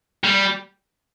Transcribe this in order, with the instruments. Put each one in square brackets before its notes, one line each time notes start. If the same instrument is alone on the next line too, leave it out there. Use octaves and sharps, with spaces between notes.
[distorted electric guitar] G3